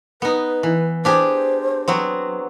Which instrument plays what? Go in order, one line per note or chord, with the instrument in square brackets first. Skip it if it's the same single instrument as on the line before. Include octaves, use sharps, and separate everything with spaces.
[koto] B3 D#4 [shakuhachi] B4
[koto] E3
[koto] D4 G4 G#4 [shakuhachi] C5
[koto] F#3 B3 C4